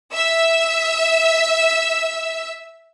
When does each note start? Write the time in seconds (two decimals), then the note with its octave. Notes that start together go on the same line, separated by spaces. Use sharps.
0.13 E5 E6